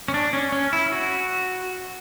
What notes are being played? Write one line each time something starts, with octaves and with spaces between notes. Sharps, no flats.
C#4
D4
C#4
C#4
E4
F#4